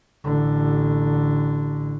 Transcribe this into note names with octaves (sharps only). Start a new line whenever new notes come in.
A1 D3